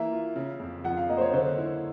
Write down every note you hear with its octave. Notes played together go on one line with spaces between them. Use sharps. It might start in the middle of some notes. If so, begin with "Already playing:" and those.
Already playing: E3 A#3 E5
F4
C#3
F2
F3 F#5
F5
A#3 D#5
C5
C#5
D3 C5
E4